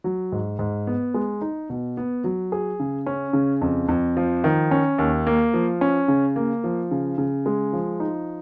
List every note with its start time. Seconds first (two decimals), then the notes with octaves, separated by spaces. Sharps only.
0.04 F#3
0.32 G#2
0.59 G#2
0.87 B3
1.14 G#3
1.41 D#4
1.70 B2
1.97 B3
2.24 F#3
2.52 G#4
2.80 C#3
3.06 C#4
3.33 C#3
3.61 F2
3.89 F2
4.17 F3
4.44 D#3
4.71 C#4
4.98 D#2
5.27 A#3
5.54 F3
5.81 C#4
6.08 C#3
6.36 A#3
6.64 F3
6.91 C#3
7.18 C#3
7.46 G#3
7.73 F3
8.00 D#4